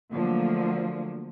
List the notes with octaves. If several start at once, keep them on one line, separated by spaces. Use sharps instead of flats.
D3 F3 F#3 A3 A#3